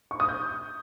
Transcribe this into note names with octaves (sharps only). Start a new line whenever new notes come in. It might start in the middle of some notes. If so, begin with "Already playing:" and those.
C#6
D#6
G6